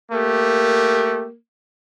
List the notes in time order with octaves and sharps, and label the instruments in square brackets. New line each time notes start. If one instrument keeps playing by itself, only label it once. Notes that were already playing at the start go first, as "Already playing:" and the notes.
[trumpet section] A3 G4 [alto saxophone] A#3